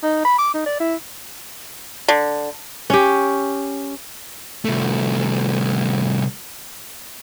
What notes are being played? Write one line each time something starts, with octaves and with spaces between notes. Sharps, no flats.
D#4
B5
D6
D#4
D5
E4
D3
C#4 G4
C2 A3